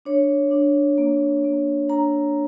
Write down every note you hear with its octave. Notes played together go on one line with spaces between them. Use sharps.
D4 C#5
D4
A#3
A#3
D4 A#5